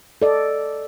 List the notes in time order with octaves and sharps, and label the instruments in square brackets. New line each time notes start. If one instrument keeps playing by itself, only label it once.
[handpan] A4 D5 D#5